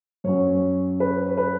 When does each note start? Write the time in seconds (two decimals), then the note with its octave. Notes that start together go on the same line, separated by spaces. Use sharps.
0.24 F#2 F#3 C#4 C#5
1.00 B4
1.37 B4